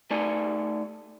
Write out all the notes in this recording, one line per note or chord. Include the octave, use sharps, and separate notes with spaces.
A3 D#4 D5 G#5